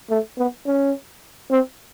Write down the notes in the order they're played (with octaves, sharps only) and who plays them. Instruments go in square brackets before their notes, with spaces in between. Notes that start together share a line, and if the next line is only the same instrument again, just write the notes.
[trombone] A3
B3
C#4
C4